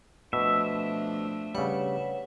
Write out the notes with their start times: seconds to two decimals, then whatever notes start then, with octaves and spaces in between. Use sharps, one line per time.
0.33 B2 F3 A3 D4 E5
1.55 C#3 G3 B4 C#5 F#5